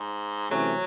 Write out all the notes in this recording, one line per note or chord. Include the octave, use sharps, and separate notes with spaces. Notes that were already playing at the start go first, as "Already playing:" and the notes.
Already playing: G#2
C3 E3 F#3 A3 C#4